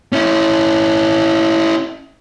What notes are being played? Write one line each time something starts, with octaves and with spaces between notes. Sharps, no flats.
C#4 E4